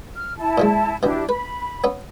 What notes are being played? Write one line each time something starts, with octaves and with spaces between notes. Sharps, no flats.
F6
E4 A5
A#2 F3 G#3
B2 E3 D4 E4 G4
B4 B5
B3 C#4 E5